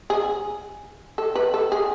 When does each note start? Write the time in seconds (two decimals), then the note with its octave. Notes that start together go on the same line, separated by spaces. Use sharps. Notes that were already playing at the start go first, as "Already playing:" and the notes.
0.10 G#4
1.18 A4
1.35 B4
1.54 A4
1.72 G#4